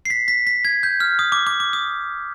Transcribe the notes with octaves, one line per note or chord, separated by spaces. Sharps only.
C7
B6
B6
B6
G#6
G6
F6
D#6
D6
D6
D6
D#6